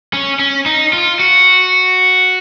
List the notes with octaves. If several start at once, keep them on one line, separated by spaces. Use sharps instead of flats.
C#4
C#4
D#4
F4
F#4